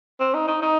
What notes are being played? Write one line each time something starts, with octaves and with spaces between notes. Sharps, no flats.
C4
D#4
D#4
D#4